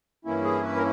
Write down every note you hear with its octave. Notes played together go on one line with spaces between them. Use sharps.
G2 E3 A#3 C#4 E4
G#4
B4
A#4